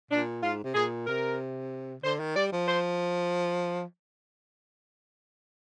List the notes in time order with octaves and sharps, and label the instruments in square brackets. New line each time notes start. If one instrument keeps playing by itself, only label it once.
[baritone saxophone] A#2 [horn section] D4
[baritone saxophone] G#2 [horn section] F4
[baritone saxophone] C3
[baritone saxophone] A#2 [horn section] G#4
[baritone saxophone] C3 [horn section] A#4
[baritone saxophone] D3 [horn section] C5
[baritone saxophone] D#3
[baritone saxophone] G3 [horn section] D5
[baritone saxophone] F3
[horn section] C5